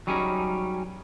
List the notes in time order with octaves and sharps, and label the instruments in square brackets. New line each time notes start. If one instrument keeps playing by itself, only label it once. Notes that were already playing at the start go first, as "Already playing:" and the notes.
[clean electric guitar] F#3 G3 C#4 D#4 G#4